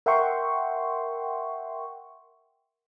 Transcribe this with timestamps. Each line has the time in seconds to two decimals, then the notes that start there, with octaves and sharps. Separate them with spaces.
0.06 A#4 E5 F#5 G5 C6 C#6